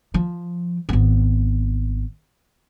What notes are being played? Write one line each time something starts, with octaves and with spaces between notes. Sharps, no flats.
F3
G#1 B3